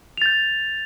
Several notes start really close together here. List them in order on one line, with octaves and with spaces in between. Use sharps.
F7 A6 G6